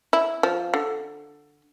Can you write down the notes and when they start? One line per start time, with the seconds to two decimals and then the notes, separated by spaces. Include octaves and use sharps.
0.13 E4
0.43 F3
0.74 D3